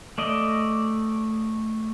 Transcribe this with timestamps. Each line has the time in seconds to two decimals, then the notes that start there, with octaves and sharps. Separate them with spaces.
0.18 A3 D5 D#5